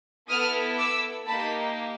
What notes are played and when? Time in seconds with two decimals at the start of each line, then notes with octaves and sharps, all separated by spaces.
0.29 B3 E4 A4 D#6 F6
0.78 D6 E6
1.27 A#3 D#4 G4 A5 B5